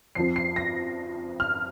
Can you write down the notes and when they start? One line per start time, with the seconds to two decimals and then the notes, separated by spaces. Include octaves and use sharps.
0.15 F2 F3 C4 C7
0.36 C7
0.56 A#6
1.40 F6